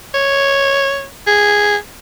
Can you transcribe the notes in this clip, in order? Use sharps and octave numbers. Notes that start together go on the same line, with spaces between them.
C#5
G#4